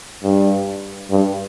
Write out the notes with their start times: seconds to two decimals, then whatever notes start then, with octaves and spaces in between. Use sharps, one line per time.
0.23 G2
1.11 G2